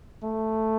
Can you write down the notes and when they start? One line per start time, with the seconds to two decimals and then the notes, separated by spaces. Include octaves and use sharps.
0.23 A3